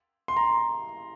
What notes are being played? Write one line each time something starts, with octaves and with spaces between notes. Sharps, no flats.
C6
A#5